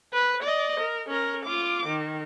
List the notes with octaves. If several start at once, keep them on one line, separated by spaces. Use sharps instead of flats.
B4
D5 D#5
A#4
C#4 A#4
F4 D6
D#3